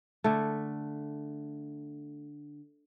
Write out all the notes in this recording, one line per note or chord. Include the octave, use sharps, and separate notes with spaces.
D3 A3